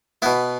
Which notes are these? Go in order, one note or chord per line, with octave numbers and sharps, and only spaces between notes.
B2 B3 E4